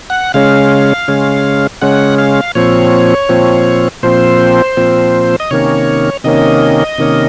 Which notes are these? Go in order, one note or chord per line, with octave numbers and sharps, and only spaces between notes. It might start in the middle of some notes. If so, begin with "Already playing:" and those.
F#5
C#3 G#3 C#4 F5
C#3 G#3 C#4
C#3 G#3 C#4 F#5
F5
A#2 F3 C4 C#5
A#2 F3 C4
A#2 F3 C4 C5
A#2 F3 C4
D#5
C3 D#3 A#3 C#4 C#5
C3 D#3 A#3 C#4 D#5
C3 D#3 A#3 C#4